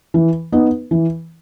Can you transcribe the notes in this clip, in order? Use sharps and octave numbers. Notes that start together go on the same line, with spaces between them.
E3
B3 D#4
E3